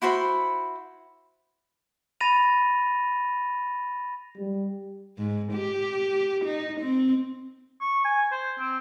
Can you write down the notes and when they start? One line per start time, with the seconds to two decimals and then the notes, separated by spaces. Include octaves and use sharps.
0.02 E4 F#4 C5 B5
2.20 B5 A6 A#6 D#7 F7
4.38 G3
5.18 G#2
5.52 G4
6.45 D#4
6.81 C4
7.81 C#6
8.05 G#5
8.32 C5
8.59 C4